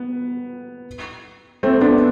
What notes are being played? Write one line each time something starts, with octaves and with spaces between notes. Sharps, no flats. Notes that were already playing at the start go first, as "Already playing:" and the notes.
Already playing: B3
A3 C4
B3 D4